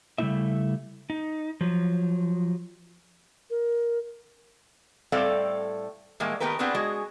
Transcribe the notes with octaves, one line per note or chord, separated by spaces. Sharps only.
C#3 G3 A3 C4 E4 E5
D#4
F3 F#3
A#4
A2 G3 C4 A4 D5 F5
A2 D#3 G3 G#3 A#3
D#3 A3 B3 G4 A#4 B4
B3 C4 D4 F4 G#4 B4
G#3 F#4 G#4